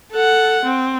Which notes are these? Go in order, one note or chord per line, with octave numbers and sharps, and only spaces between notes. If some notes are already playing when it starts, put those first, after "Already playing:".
A4 F#5
C4